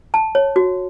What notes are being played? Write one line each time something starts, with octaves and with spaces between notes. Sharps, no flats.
A5
C#5
F#4